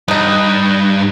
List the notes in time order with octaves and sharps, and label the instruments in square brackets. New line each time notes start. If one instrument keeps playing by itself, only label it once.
[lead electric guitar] G2 [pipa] B3 D#4